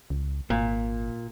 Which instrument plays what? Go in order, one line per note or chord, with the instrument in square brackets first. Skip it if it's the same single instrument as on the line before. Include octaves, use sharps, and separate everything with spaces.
[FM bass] C#2
[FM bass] G#1 [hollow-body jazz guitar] A#2